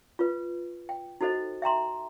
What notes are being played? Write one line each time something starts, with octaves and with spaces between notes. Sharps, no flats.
F4 B4
G5
D#4 F#4 A4 C5 D#5
E5 G5 A#5 C6